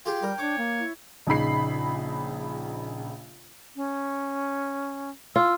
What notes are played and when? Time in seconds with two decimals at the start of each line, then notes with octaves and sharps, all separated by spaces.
0.06 F4 G4 G#4 G5
0.23 G3 A#4
0.38 D4 C#5 D6
0.58 A#3
0.79 E4
1.27 A#1 C#3 D#4 B5 C7
3.76 C#4
5.36 F4 E6